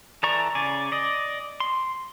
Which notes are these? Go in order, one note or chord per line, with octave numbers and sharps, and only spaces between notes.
E3 A4 D5 A#5 C#6
C#3 D5 G#5
D5 D#5
C6